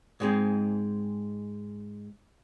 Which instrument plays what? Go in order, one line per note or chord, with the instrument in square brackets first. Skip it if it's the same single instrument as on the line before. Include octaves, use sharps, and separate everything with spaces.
[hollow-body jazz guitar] G#2 G#3 C4